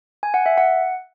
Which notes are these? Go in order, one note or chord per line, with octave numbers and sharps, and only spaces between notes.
G#5
F#5
E5
F#5